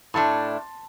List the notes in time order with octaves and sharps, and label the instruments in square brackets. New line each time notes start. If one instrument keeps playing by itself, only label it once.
[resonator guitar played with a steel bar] A2 A3 D4 [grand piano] A5 C6